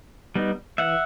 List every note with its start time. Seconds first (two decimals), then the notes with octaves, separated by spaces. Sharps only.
0.35 G3 B3 D#4
0.78 E3 E5 F#5